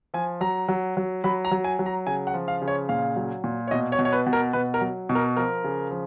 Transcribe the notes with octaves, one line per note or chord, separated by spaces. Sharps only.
F3 G#5
F#3 A#5
F#3
F#3
F#3 B5
A#5
F#3
G#5
F#3
A#5
C#3 G#5
F#5
F3
F5
C#3
C#5
A#2 F5
F#3
A#2
C#5
B2 D#5
C#5
B2
C#5
B4
B2
A#4
B2 B4
A#4
F#3
B2
A#4
F3 A#4
C#3
F3